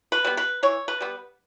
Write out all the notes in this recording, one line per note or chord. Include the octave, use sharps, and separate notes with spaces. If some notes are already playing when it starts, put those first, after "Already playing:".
B4
G3 B3
B4
E3 C#5
B4
G3 B3